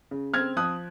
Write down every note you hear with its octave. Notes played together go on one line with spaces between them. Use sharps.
C#3
C4 F6 G#6
F3 D#6 F#6